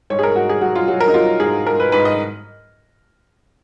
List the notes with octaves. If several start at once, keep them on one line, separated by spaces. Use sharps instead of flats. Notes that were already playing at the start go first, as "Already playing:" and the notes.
G#2 C#5
G#4
A#4
G#2 F#4
G#4
F#3 F#4
F4
F#3 F#4
A#4
D#4
F#3 F4
G#2 G#4
G#2 A#4
B4
G#2 B4
D#5